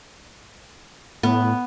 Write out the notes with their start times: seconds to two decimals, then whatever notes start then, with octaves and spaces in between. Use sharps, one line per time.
1.23 A2 B3